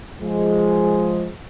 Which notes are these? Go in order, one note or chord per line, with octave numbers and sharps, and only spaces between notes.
F3 G#3